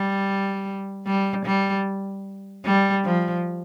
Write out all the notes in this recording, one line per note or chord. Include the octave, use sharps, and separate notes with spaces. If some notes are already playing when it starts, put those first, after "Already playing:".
Already playing: G3
G3
G3
G3
F3